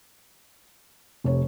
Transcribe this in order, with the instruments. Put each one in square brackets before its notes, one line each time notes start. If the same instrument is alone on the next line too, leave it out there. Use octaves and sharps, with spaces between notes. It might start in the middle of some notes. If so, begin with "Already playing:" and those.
[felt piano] F1 C#5 [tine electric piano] C3